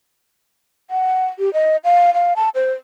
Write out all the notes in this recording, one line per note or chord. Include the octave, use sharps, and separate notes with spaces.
F#5
G4
D#5
F5
F5
A5
C5